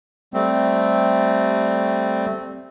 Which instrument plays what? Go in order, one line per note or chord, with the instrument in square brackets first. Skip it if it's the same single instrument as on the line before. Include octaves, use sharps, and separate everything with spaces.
[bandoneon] G3 A3 C4